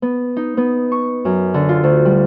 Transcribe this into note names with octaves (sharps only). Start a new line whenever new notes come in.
B3
D#4
B3
C#6
F#2
D3
F4
D2
G3